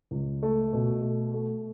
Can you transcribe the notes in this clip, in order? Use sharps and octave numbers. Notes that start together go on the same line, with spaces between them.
C#2
A3
B2
A3
A3